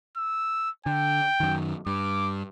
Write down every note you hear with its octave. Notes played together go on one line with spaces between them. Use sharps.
E6
D3 G5
F#2 D#3
G2 D6